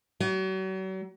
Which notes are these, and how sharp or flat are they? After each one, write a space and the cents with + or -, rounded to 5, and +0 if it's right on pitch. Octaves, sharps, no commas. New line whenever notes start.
F#3 +40